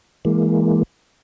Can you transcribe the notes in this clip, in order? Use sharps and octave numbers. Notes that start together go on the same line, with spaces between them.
E3 G#3 A#3